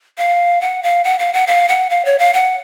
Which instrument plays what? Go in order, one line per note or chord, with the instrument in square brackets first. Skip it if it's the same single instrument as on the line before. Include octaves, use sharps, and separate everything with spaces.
[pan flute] F5
F#5
F5
F#5
F5
F#5
F5
F#5
F5
C#5
F5
F#5